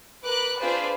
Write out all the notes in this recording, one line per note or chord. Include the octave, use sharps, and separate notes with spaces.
A#4 B4 D6 F#6
D4 F4 G#4 B4 C5 D5